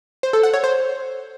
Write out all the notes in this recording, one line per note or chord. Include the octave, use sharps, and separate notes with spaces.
C5
A4
F#5
C#5
C5